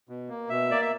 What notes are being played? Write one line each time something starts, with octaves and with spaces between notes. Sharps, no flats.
B2
A#3
B2 E5
A#3 D5
E5